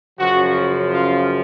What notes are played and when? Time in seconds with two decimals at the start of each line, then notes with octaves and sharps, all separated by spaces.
0.18 F#2 C#3 F3 F#4
0.93 F4